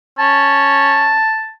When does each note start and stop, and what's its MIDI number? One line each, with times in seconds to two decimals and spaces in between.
0.19 1.18 61
0.19 1.51 81